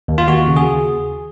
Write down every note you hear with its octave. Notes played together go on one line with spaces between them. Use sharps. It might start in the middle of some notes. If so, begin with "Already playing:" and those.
D#2
F4
D#2 F#4
C#3
G#4